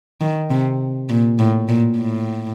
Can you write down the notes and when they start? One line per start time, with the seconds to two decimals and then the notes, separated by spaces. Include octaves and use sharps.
0.21 D#3
0.50 C3
1.09 A#2
1.39 A2
1.68 A#2
1.97 A2